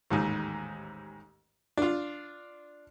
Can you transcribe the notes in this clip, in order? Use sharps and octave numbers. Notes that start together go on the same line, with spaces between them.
A1 D#2 G#2
D4 F4